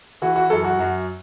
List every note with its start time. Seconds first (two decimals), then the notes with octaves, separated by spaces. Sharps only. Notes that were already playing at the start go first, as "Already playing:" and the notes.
0.22 E3 F#4
0.36 F#4
0.50 F#2 A4
0.65 F#4
0.79 F#2